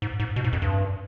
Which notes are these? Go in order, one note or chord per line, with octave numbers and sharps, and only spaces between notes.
G#2
G#2
B2
G#2
F2
G2